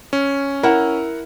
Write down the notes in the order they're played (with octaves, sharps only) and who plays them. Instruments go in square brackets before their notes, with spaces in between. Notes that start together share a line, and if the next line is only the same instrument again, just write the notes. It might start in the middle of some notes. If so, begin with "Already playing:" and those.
[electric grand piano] C#4
[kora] E4 [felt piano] A#4 F#5